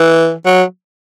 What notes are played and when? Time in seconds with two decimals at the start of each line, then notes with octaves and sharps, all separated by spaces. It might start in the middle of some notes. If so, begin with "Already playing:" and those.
Already playing: E3
0.45 F#3